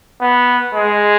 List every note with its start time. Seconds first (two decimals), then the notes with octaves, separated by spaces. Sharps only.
0.21 B3
0.75 G#3